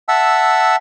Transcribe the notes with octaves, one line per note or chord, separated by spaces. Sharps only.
E5 F#5 A5 E6